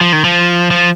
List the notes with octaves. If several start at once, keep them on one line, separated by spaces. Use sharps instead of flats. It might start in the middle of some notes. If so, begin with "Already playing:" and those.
F3
D#3
F3
F3